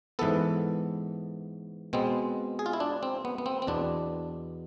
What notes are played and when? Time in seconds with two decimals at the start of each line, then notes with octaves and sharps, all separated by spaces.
0.19 G#2 E3 B3 A4
1.93 B2 G#3 B3 C4
2.59 G#4
2.66 F4
2.73 E4
2.80 D4
3.03 C4
3.25 B3
3.38 B3
3.46 C4
3.62 C4
3.67 E2 B2 B3 D4